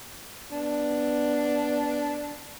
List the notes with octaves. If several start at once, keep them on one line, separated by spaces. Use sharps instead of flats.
B3 D4